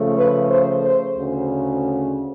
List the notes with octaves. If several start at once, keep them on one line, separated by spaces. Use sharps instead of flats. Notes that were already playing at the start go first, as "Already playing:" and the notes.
Already playing: C#3 F3 A3
B4
C5
C5
D2 C#3